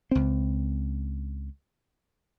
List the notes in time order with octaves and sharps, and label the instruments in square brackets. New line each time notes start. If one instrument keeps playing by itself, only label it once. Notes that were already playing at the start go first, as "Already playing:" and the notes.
[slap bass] C#2 C4